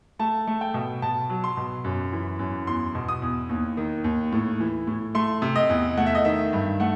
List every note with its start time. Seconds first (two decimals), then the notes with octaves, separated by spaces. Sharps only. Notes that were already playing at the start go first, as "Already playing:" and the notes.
0.19 A3 A5
0.47 A3
0.61 G5
0.74 B2
1.02 B2 A5
1.30 F#3
1.44 C6
1.57 B2
1.84 F#2
2.12 E3
2.39 F#2
2.67 E2 C6
2.95 B2
3.08 D#6
3.22 E2
3.49 D#2
3.77 D#3
4.04 D#2
4.32 A2
4.60 E3
4.87 A2
5.15 A3 C6
5.42 C3
5.56 D#5
5.69 E2
5.97 A3 F#5
6.06 E5
6.15 D#5
6.25 D#3 E5
6.53 G2
6.80 A3 F#5